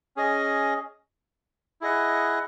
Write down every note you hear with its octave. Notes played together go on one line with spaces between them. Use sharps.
C#4 G#4 D#5
E4 G#4 D#5 F#5